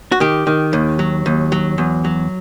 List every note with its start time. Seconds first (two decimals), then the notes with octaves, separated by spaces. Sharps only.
0.12 F#4
0.20 D#3 G4
0.47 D#3
0.73 D#2
0.99 F#3
1.26 D#2
1.52 F#3
1.78 E2
2.04 F#3